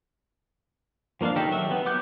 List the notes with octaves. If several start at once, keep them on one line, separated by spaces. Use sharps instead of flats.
F3 A#3 D4 F4 F5
D#3 D#4 G4 A4
F#3 E5
B3
F#3 B3 D6 F#6 G6